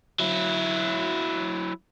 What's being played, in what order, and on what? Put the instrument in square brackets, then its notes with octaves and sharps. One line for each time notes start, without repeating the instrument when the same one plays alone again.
[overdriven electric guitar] F#3 E4